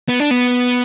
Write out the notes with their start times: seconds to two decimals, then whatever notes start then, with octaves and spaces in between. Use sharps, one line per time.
0.09 B3
0.20 D4
0.31 B3